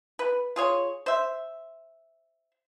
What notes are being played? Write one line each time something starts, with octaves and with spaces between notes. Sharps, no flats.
B4
F4 G#4 C#5
C5 E5